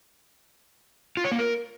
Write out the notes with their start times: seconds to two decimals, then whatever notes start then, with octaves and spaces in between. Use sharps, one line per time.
1.17 F4
1.24 C#5
1.32 A#3
1.39 A#4